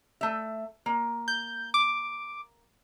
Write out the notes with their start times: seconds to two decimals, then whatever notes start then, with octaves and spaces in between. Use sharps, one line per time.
0.21 A3 E5
0.86 A#3
1.28 G6
1.74 D6